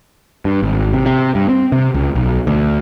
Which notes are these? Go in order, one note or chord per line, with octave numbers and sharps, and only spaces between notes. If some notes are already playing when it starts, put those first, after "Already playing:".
G2
G#1
C3
C3
G2
C4
C3
C#2
B1
D2